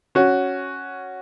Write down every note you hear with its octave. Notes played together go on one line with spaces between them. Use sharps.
C#4 F#4